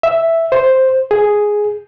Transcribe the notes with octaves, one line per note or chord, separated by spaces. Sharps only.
E5
C5
G#4